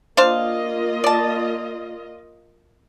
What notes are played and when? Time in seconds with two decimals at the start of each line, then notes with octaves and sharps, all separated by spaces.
0.17 A#3 D4 F4 C5 D#5 F5
1.04 D5 A5